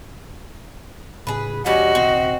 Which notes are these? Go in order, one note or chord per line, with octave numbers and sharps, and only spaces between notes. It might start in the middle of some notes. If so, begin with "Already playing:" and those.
A1 A2 C#3 G#4 B4
E1 G3 C#4 F#4 D#5
D#1 C2 C4